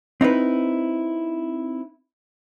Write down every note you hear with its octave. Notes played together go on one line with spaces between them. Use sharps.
C4 D#4 E4 B4